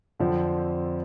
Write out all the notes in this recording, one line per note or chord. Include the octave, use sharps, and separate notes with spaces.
F2 D3 F3 C4